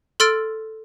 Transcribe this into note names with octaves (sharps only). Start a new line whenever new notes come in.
A4 C6 E6 F6 A6 D7